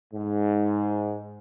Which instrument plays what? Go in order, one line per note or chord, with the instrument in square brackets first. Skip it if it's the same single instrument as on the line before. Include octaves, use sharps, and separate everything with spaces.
[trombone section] G#2